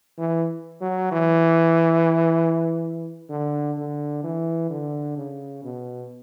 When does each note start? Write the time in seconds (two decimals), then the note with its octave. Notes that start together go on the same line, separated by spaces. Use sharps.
0.18 E3
0.81 F#3
1.12 E3
3.30 D3
3.77 D3
4.23 E3
4.70 D3
5.17 C#3
5.64 B2